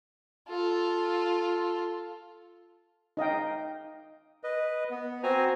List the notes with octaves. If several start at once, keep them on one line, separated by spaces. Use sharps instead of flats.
F4 A4
D#4 D#5 F5 G5
B4 D#5
B3
C4 F#4 C5 G#5 A#5